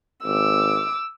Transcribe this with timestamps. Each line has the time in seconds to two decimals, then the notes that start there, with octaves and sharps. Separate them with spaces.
0.25 G#1 D6 E6